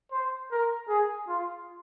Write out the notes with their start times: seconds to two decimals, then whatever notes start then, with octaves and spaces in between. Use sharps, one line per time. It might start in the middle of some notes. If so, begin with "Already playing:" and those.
0.12 C5
0.51 A#4
0.88 G#4
1.28 F4